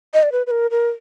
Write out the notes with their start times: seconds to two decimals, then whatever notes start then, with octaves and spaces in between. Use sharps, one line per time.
0.14 D#5
0.23 D5
0.32 B4
0.47 B4
0.51 A#4
0.71 A#4